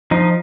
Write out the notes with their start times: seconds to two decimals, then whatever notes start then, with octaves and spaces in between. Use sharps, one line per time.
0.11 F3 D#4